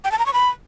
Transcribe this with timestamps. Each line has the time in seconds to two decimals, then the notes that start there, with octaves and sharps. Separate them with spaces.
0.04 G5
0.12 A5
0.19 A#5
0.26 C#6
0.33 B5